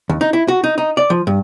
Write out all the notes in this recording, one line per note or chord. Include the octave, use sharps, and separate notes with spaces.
D#2
D#4
E4
F#4
D#4
D#4
D5
F3
G2